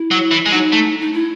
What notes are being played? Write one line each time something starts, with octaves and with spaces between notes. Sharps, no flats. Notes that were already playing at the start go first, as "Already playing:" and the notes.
Already playing: E4
F#3
E3
G#3
F#3 D#4
A3
D#4
E4